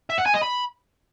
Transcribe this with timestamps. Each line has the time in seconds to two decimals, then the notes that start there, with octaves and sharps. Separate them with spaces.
0.10 E5
0.18 F#5
0.26 G#5
0.34 D#5
0.43 B5